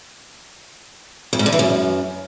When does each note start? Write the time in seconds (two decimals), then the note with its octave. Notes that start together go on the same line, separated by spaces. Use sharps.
1.33 F2
1.39 G#2
1.46 D3
1.52 E3
1.59 F#2